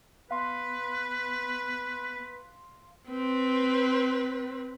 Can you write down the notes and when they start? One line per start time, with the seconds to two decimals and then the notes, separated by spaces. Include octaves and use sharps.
0.31 B3 B4 F5 C6
3.10 C4 B4